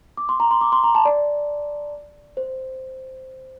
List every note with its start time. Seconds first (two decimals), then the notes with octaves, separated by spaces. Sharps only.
0.17 D6
0.29 C6
0.40 A#5
0.51 C6
0.61 D6
0.72 C6
0.84 A#5
0.95 A5
1.05 D5
2.37 C5